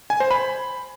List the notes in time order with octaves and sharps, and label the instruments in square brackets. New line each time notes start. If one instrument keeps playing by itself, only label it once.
[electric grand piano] G#5
C5
B5